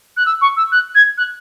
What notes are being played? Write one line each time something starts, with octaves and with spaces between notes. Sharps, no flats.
F#6
E6
C#6
E6
F#6
G#6
F#6